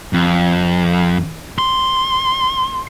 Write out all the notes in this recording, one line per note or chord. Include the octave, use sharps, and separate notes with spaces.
F2
C6